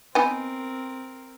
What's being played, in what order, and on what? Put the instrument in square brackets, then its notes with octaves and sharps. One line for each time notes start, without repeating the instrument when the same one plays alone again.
[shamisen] B3 D#4 G#5 [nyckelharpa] C4 A#4